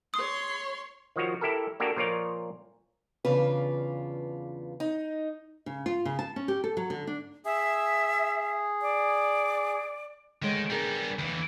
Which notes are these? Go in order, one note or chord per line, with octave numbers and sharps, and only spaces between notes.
C#5 C6 D#6
D#3 F3 F4 F#4 C#5
E4 G4 A4 A#4
A#3 D4 F#4 G4 A4 A#4
A#2 F3 F4 A#4 C#5 D5
E2 C#3 D4 F4 B4
D#4
C#3
F4
C#3
A5
C#4
G4
A4
F#3
D3
D4
G#4 E5
D5
D2 D#3 G#3 C#5 G5
G3 B3 D4 G#4 A#4
D#2 E3 B4